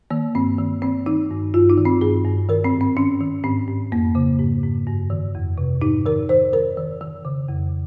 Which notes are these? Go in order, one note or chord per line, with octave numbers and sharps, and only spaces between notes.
D#3 A#3
G2 C4
D#3
D#3 C4
D#3 D#4
G2
G2 F4
D#4
D#3
C4
G2 G#4
G2
D#3 A#4
C4
G#2
C4
D#3 C#4
D#3
G#2 C4
G#2
F2 A#3
C#3
G#2
G#2
G2
D#3
F2
C3
G#2 D#4
D#3 A#4
D#3 C5
D#3 A#4
D#3
D#3
C#3
F2